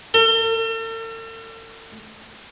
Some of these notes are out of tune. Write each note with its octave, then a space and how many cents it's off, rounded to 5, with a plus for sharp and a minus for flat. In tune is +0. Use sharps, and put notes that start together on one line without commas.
A4 +45